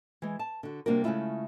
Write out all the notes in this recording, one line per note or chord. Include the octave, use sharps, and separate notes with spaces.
E3 G#3
A5
D3 F#4
C3 G3 A#3 D4 F#4 A#4
C#3 G#3 A3 C#4 E4 F4